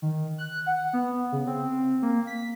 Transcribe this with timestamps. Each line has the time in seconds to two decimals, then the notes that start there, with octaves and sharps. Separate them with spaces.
0.02 D#3
0.38 F#6
0.66 F#5
0.93 B3
1.32 C#3
1.47 C4
2.02 A#3
2.27 B6